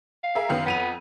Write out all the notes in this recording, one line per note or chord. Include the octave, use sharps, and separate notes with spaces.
F5
G#4 A#4 E5
F#2 D#3 B3
F2 B3 D#7 F7